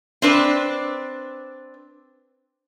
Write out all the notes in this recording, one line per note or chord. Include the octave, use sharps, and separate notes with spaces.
C4 D4 B4